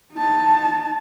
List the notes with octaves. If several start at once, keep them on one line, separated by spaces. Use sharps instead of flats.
D#4 A5